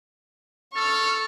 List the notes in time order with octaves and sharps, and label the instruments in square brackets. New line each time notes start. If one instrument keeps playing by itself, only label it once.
[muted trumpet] A4 [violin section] C#6 F6